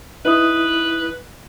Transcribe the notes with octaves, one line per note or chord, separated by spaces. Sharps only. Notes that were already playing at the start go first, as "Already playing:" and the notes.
D#4 E4 B4 D#6